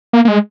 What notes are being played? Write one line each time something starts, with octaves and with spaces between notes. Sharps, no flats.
A#3
A#3
G#3